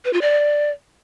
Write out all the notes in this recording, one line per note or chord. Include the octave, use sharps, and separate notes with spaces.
B4
F4
D5